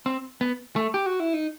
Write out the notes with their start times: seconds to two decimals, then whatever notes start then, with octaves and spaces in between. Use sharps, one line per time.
0.06 C4
0.41 B3
0.76 A3
0.94 G4
1.06 F#4
1.20 E4
1.33 D#4